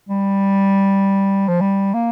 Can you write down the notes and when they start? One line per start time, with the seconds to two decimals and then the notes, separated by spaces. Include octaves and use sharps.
0.09 G3
1.48 F3
1.61 G3
1.94 A#3